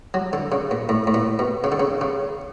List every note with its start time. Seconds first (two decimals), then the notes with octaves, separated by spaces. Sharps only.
0.14 F#3
0.33 D3
0.52 C#3
0.71 A#2
0.89 A2
1.07 A2
1.14 A#2
1.39 B2
1.64 C#3
1.72 D3
1.80 C#3
2.01 C#3